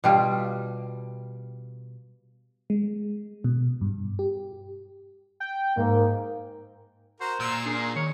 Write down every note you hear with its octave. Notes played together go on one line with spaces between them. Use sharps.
B2 G3 F4
G#3
B2
G2
G4
G5
G#2 A#3
F#4 A#4 C5 A#5
A#2 A#5 E6
D4 G#4 A#4
D#3 C#5